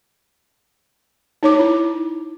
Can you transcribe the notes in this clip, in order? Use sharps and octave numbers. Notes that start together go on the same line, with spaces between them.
D#4 C#5 D6
E4